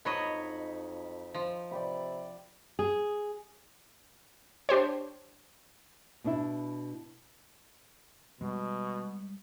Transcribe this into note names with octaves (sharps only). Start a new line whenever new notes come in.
F2 F#3 D#4 C#5 D#5 B5
F3
C3 D5 G5 B5
G#4
D4 G4 C5 C#5
B2 D4 E4
B2 G3 G#3